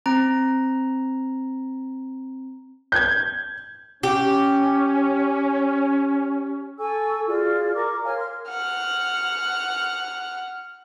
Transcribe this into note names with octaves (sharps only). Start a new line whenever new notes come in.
C4 A#5
G6 G#6
C#4 G4
A4 G#5 C#6 E6
F4 F#4 G#4 D5
A#4 A#5 C#6 D6
C#5 F5 G#5 F6
A#4 C6 F6
F#5 F6